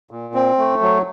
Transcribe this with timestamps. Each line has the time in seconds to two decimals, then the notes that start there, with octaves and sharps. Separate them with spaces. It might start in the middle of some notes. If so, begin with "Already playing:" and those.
0.11 A#2
0.34 C4
0.58 A3
0.82 F#3